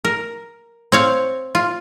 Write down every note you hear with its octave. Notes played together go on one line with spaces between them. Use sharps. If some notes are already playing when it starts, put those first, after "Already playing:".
A#4
C4 C#5 F5
F4